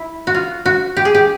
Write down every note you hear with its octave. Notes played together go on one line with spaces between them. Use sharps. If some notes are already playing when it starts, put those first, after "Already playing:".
Already playing: E4
F#4
F4
F#4
G4
G#4
G4